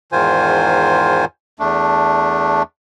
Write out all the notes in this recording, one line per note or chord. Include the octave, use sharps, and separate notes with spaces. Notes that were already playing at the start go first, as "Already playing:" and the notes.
E2 G#2 D#3 F4 C5 G#5
E2 A3 D4